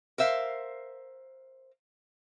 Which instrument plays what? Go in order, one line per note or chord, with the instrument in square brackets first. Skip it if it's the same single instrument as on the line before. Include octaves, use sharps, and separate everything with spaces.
[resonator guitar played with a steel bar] A#4 C5 E5 F5